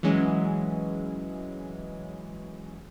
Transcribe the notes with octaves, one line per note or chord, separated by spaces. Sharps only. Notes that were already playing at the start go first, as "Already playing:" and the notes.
E3 F#3 G#3 C#4